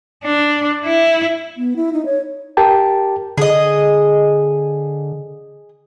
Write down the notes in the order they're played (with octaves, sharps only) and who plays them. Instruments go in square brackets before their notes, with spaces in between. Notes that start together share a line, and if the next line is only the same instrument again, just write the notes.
[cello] D4
E4
[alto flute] B3
E4
D#4
C#5
[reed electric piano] G4 A#4 G5 A5
[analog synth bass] D3 [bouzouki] G#4 D#5